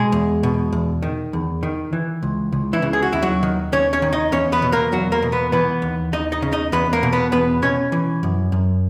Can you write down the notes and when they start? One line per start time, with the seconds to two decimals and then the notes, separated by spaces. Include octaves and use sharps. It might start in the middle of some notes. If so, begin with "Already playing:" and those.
Already playing: B2 G#3 G#4
0.12 E2
0.43 B2
0.73 E2
1.02 D#3
1.33 E2
1.63 D#3
1.93 E3
2.23 C#2
2.52 C#2
2.73 E3 E4
2.82 C#3
2.93 G#4
3.02 F#4
3.12 D#2 E4
3.22 F#3 F#4
3.43 D#3
3.72 D#2 C#4 C#5
3.93 C#4 C#5
4.02 D#3
4.13 D#4 D#5
4.32 E2 C#4 C#5
4.52 B3 B4
4.62 B2
4.72 A#3 A#4
4.92 E2 F#3 F#4
5.12 A#3 A#4
5.22 B2
5.32 B3 B4
5.52 E3 B3 B4
5.82 D#2
6.13 D#2 D#4 D#5
6.32 D#4 D#5
6.42 C#3
6.52 D#4 D#5
6.72 E2 B3 B4
6.93 A#3 A#4
7.03 B2
7.13 B3 B4
7.32 E2 B3 B4
7.62 B2 C#4 C#5
7.92 E3
8.23 F#2
8.52 F#2